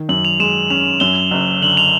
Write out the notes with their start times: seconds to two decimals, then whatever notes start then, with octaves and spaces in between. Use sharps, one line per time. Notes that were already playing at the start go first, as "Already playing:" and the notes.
Already playing: D#3
0.09 F#2 F#7
0.25 F7
0.40 G#3 E7
0.70 C#4 F7
1.00 F#2 G7
1.31 F#1
1.62 D3 F#7
1.77 F7